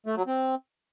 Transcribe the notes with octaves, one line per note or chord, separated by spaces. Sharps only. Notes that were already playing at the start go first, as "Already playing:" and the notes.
A3
F#3
C4